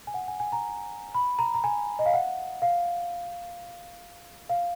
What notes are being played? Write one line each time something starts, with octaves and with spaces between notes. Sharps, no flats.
G#5
F#5
G#5
G#5
A#5
B5
A#5
A#5
G#5
D#5
F5
F#5
F5
F5